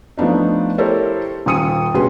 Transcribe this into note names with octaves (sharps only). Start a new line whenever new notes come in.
F3 A3 B3 D4 D#4
E4 G4 A4 A#4 C5 C#5
D#1 G#5 D#6 C#7 D#7
D2 B2 C#4 G#4 B4 C6